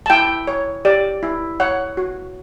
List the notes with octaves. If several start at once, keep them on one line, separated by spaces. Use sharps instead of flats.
A5
E4 G5
C#5
G4 D5
E4
C#5 F#5
F#4